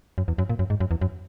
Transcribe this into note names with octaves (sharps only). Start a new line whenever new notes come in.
F#2
E2
F#2
A#2
F#2
G#2
F#2
E2
F#2